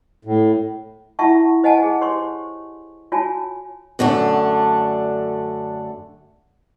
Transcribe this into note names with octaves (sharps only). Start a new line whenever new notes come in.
A2
E4 F4 E5 F#5 A5 C#6
C5 D#5 F#5 G#5 A5
G#4
G4 C5 C#5 C6 C#6
F4 F#4 C#5 G#5 A5
F#2 D3 A3 D4